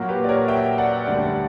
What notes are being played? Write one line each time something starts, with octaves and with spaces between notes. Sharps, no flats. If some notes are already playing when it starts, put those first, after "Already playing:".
Already playing: A#2 F#3 F#4 A#4
G4 B4
D5
A#4 C#5
E5 G5
D5 F#5
D2 D3 G3 D5 F#5